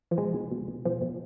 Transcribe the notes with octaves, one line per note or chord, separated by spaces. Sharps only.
F3
B2 G#3
B2
B2
B2
B2 F3
B2